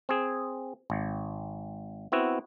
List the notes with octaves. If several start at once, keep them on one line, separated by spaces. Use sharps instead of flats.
C4 G#4
G#1
B3 C4 E4 F#4